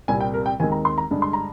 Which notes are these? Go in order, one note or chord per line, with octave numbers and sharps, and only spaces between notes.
C2 A#2 G3 C4 G#5
G5
A#4
G5
D#2 D#3 G#3 C4 G#5
A#5
C6
A#5
G2 D3 G#3
C6
A#5